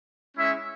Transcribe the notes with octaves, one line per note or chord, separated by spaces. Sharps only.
G#3 C#4 E4 E5